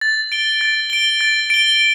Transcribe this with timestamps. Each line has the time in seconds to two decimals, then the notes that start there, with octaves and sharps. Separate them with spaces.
0.01 A6
0.32 D7 G7
0.61 A6
0.90 D7 G7
1.21 A6
1.50 D7 G7